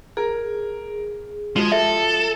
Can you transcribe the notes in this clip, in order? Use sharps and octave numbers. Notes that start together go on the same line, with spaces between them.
G#4 A#4
F3 G#3 F#4 G4
A4 E5